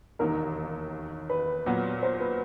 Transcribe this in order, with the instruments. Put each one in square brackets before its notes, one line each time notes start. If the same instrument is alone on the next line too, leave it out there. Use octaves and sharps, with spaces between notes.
[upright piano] E1 D#2 D#3 [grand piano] A#4
[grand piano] B4
[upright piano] A#2 F#3 B3
[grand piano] C5
B4